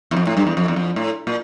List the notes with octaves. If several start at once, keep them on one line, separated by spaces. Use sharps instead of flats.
E2
F2
A2
G2
E2
F2
E2
F2
A2
A#2